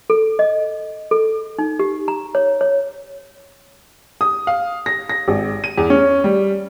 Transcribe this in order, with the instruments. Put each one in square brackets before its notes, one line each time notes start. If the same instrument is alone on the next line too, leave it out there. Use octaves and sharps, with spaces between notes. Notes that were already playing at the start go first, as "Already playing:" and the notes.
[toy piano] A4
D#5
A4
D#4
G4
A#5
C#5
C#5
[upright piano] D#6
F5
A#6
A#6
G#1
D#7
E2
C#4
G3